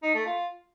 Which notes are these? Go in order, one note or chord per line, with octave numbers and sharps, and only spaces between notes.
D#4
A3
F4